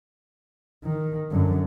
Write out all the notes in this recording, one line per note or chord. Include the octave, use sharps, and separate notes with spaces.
D#3
F#2 D3